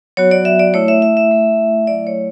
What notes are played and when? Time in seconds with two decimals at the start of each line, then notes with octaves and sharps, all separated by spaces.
0.17 F#3 B3 F#4 C#5
0.31 D5
0.45 E5
0.59 D5
0.74 A3 E4 C#5
0.88 E5
1.02 E5
1.17 E5
1.31 A3 E4
1.87 F#3 A3 E4 D5
2.07 C#5